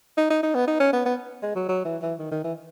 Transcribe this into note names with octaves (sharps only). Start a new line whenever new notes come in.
D#4
D#4
D#4
B3
D#4
C#4
B3
B3
G#3
F#3
F#3
E3
E3
D#3
D#3
E3